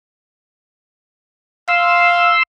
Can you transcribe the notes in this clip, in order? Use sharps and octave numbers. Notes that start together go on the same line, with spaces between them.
F5 C6 E6